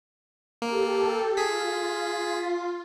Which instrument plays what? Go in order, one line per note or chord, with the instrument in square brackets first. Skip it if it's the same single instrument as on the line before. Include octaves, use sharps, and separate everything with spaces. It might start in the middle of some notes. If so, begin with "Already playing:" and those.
[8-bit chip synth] A#3 [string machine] G4 A4
[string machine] F4 [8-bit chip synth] G#4 B6